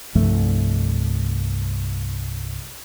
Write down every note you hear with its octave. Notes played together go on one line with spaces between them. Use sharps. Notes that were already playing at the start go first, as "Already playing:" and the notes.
C2 G2 F3 A3